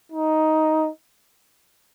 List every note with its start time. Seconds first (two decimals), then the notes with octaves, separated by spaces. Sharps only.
0.12 D#4